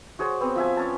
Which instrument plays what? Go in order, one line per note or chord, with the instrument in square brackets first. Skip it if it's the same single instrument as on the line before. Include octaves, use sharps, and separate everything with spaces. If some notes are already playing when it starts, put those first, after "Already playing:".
[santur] F#4 G#4 C5 C#5
B3 C4
F3 E5 G#5
C#4 A5